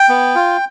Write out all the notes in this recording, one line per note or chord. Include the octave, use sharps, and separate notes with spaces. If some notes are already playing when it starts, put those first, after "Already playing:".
Already playing: G5
B3
F4